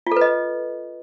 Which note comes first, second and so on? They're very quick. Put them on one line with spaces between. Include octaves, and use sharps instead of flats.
F4 A4 B4 D#5